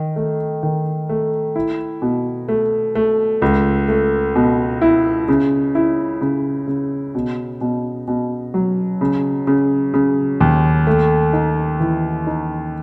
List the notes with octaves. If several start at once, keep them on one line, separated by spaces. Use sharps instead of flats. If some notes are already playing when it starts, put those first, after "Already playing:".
Already playing: D#3
A3
D#3
A3
E4
B2
A3
A3
C#2
A3
B2
E4
C#3
E4
C#3
C#3
B2
B2
B2
F#3
C#3
C#3
C#3
D#2
A3
D#4
E3
D#4